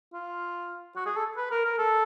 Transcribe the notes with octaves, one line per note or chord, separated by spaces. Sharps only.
F4
F#4
G#4
A4
B4
A#4
A#4
A4